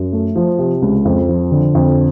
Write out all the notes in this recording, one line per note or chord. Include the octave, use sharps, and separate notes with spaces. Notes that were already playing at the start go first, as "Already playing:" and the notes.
Already playing: F#2
A3
F3
C3
C#2
F2
F3
D3
F2